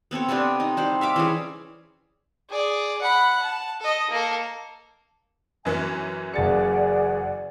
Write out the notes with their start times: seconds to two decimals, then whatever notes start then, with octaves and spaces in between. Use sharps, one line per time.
0.11 B3 C4 A4 C#5
0.29 C3 B3 C4 D4
0.60 D#4
0.77 G3 C5 F#5
1.01 E5 F5 D6
1.16 E3 C#4 G#4
2.50 G#4 D5
3.02 F#5 B5
3.42 A5
3.81 A4 D#5
4.11 A#3 A4
5.65 F#2 E3 C#4 G#5
6.34 F#1 G#4 D5 F#5 A6 C#7